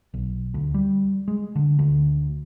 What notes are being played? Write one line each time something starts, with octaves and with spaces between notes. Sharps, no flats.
B1
D2
G3
G#3
D3
D2